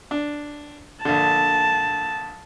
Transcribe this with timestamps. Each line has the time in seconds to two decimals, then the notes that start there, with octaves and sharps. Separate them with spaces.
0.11 D4
1.05 A#1 D3 A5